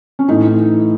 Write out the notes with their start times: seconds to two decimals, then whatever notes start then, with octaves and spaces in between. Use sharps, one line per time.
0.19 C#4
0.28 A2 E3 D#4